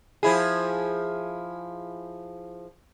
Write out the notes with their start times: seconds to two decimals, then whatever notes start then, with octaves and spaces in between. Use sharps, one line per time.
0.23 F3 E4 G#4